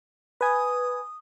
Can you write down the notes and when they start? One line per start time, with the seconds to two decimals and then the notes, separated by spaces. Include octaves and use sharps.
0.41 B4 G#5 D#6